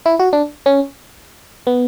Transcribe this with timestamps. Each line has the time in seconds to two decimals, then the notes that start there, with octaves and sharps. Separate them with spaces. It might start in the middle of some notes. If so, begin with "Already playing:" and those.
0.06 E4
0.19 F#4
0.33 D4
0.66 C#4
1.67 B3